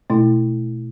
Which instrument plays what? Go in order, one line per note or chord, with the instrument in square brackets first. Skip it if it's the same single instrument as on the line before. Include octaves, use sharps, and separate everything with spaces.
[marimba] B2 A3 E4